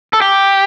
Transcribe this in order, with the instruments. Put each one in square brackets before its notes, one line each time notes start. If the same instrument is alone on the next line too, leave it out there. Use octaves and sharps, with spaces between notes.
[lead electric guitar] A4
G4